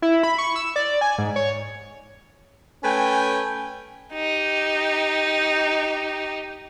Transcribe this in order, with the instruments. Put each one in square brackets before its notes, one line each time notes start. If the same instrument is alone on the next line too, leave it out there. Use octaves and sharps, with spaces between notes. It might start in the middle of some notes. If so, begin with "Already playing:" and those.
[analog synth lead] E4
B5
C#6
E6
D5
G#5
G#2
C#5
[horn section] A3 C#4 B4 G5 G#5
[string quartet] D#4 G4